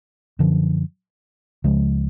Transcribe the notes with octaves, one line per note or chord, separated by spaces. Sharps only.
F#2 D3 F3
C#2 C#3 F3 G#3